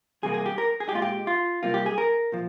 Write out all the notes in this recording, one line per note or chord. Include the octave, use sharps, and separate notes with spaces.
E2 C3 G3 A#3 G#4
G#4
G4
A#4
G#4
G4
A#2 G#3 F4
G4
F4
C2 C3 G3 A#3 F4
G4
G#4
A#4
A#2 F3